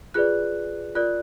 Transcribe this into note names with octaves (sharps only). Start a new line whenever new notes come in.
F4 G#4 B4 D5 F#6
F4 A#4 D5 F#6